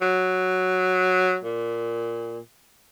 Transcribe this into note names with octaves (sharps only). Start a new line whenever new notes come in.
F#3
A#2